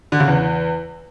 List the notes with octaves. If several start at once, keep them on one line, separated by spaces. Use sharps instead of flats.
D3
C#3
E2